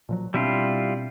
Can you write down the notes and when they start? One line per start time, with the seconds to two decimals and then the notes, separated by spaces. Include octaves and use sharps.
0.09 A#2 F3 F#3
0.34 B2 G3 C4 D4 E4 F4